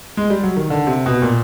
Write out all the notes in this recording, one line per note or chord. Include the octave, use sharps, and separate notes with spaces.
G#3
G3
F#3
D#3
D3
C3
B2
A#2